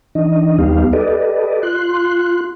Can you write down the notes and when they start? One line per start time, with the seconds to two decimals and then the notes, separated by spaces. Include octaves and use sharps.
0.15 E3 D4 D#4 D#5
0.58 D#2 G3 B3 D#4 G4 F5
0.93 G4 A4 B4 D5 D#5
1.63 F4 C6 F#6